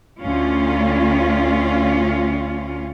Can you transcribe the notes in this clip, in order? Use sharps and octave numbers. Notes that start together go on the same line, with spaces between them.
D2 C#4 F4